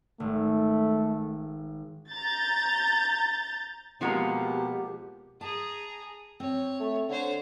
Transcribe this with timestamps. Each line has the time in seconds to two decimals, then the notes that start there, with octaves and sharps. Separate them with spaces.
0.20 G#1 A3
2.11 A#5 G6 A6
4.01 B2 F3 G#3 A#3 C4 G4 F#5 A#5
5.41 G#4 A5 A#5
6.40 C4 C#5
6.80 A3
7.09 D3 C5 C#5